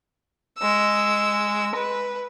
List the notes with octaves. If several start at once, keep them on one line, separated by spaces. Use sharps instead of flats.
G#3 E6
B4